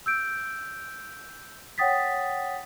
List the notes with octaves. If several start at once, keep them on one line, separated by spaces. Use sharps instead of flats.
E6 G6 D7
C#5 F#5 G5 D#6 A6 B6